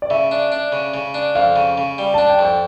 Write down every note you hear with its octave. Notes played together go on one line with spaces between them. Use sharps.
D5
C#3 E5
D4
D4
C#3
C#3
D4
F2 F5
C#3
C#3
G3
D4 A5
G5
F2
G5